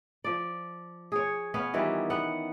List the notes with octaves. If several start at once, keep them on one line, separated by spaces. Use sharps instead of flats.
F3 D5
G#4 C#5
B3 C#4 C#5 F5
D#3 E3 G3 F4
B3 F#5